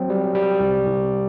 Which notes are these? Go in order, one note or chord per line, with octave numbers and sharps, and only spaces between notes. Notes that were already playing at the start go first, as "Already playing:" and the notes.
Already playing: F#3 C4
G3
G3
C2
C2